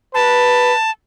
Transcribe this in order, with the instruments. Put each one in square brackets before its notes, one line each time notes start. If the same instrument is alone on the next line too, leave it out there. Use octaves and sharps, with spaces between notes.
[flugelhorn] B4 [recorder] A5